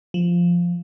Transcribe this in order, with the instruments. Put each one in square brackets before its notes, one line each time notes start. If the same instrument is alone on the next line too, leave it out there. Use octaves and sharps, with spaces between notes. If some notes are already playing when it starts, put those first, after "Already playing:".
[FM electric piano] F3